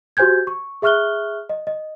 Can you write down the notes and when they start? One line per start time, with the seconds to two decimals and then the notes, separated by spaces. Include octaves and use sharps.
0.17 F#4 G4 C5 G#5 G6 G#6
0.47 C#6
0.82 G#4 E5 C#6 F6 F#6 G7
1.49 D#5
1.67 D#5